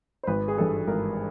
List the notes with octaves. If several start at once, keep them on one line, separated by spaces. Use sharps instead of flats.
C5
G#1 B4
G#4
G2 E3 G3 A4
G#1 A#4